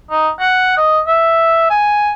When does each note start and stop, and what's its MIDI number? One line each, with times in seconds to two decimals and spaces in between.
0.11 0.28 63
0.39 0.73 78
0.77 0.99 75
1.07 1.68 76
1.70 2.13 80